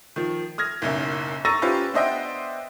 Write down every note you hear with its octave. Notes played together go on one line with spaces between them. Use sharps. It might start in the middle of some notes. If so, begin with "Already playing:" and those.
D#3 F3
D#6 F6 G#6 A#6
F#1 B1 F#2
A#5 C#6 E6 A6 A#6 D#7
C#4 F4 G4 B4 C5
B3 D4 C5 D#5 E5 G5